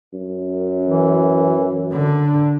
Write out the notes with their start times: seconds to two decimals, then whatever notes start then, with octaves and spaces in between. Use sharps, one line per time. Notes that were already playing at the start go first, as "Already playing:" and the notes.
0.13 F#2
0.87 E3
1.93 D3 D4